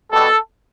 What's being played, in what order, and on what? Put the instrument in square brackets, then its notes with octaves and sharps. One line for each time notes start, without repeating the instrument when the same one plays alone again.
[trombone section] B2 G3 A4